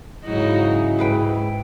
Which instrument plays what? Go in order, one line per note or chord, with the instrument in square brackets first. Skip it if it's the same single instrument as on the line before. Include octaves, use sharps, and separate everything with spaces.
[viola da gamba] G#2 D#4 F#4 [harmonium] C#3 F#3 [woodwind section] E4
[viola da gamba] G#2 [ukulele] G#4 B4 G5